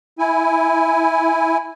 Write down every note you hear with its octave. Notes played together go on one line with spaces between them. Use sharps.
E4 G#5